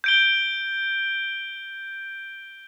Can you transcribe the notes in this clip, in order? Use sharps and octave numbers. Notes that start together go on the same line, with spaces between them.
G6 D7 G7